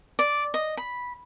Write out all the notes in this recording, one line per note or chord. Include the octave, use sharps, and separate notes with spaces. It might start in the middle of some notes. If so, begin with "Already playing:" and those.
D5
D#5
B5